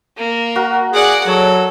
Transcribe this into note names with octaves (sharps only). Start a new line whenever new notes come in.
A#3
F#4 A#4 F5
G#4 D5 F#5
F#3 A4 C#5